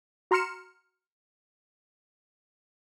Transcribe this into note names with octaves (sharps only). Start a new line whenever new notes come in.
F#4 A#5 C6 F6 C#7 E7